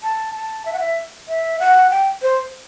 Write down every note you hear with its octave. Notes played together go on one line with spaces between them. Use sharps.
A5
A5
E5
F#5
E5
E5
F#5
G5
C5